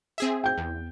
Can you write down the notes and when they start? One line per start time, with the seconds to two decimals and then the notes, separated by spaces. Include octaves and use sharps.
0.18 C4 G#4 E5
0.44 G5 G6
0.58 E2